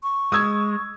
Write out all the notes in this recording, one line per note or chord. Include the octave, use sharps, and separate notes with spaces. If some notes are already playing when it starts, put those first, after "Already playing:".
C#6
G#3 D#6 E6 G#6